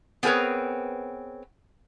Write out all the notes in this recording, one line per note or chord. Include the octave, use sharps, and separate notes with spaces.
B3 C4 G#4 A#4 B4 C#5